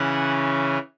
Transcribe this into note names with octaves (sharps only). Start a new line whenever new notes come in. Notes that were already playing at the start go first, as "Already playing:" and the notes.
Already playing: C#3 E3 C#4 F#5